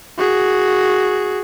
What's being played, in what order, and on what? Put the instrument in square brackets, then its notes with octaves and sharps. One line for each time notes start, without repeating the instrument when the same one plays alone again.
[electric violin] F#4 G#4